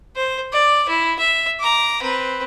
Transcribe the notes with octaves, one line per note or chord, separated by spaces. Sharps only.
C5
D5
E4
E5
A#5 D6
C4 B4